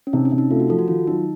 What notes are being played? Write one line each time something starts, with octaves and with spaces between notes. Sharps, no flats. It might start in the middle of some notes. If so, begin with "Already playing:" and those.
C#4
C3 D#4
C#4
C3
D#4
A3 F4
F#4
F3 A4
F#4
D#3 F4
F#3 D#4